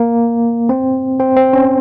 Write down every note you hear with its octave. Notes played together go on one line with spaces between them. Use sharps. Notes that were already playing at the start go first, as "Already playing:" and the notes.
Already playing: A#3
C4
C4
C4
C#4